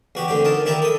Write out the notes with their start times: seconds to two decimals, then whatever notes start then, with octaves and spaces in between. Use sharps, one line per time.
0.15 E2 F#4 G4
0.28 D2 D3 C4 G4
0.45 D#4 A#4 A5
0.66 D#3 E4 G4 A5 A#5
0.82 A4 D#6